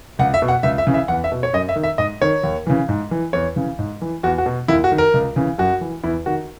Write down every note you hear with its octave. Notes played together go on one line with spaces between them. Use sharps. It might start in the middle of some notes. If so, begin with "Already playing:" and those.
C#2 F#5
E5
B2
F#5
C#2 E5
E5
C#3 E3
E5
E2 F#5
E5
B2
C#5
F#2 D#5
E5
D#3
E5
G#2 D#5
D#3 C#5
D#2
C#3 E3
G#2
E3
E2 C#5
C#3 E3
G#2
E3
E2 F#4
F#4
B2
D#2 E4
F#4
D#3
A#4
C#2
C#3 E3
F#2 F#4
E3
E2 E4
D#3 F#4